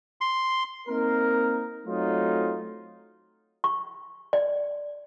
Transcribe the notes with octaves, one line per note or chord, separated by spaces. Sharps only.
C6
A#3 C4 D#4 A#4
F#3 A3 C4 D#4 F4
C#6
D5